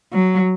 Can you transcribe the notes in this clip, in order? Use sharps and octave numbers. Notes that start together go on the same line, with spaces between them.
F#3